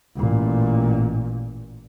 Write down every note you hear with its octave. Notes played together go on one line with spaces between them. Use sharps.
A1 A#2